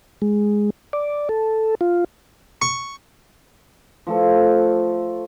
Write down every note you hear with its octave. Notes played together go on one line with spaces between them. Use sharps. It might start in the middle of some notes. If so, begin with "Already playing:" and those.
G#3
D5
A4
F4
C#6
F3 A3 A4